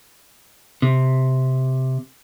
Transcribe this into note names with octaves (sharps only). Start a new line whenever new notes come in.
C3